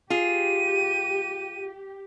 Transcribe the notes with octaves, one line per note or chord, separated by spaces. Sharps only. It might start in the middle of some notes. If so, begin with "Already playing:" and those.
F4 G4 G#4 D#7